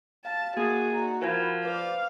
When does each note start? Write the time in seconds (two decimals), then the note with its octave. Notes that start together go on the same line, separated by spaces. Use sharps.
0.25 F5 A5
0.57 A#3 F#4 G#4 D6 D#6 A6
0.93 D#4 F#4 D5 A#5
1.21 F3 E4 A#4 C5 G5 B5 G#6
1.65 B4 C5 D5 F5 D6